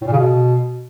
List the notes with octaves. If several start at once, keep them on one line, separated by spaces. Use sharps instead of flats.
A2
A#2
C#3
B2